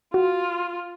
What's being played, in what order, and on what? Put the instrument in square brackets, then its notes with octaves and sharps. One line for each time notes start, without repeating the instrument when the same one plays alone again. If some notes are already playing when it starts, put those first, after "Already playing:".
[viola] F4 [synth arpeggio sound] F#4